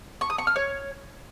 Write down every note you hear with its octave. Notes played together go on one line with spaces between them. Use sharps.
C#6
D#6
C#6
F6
C#5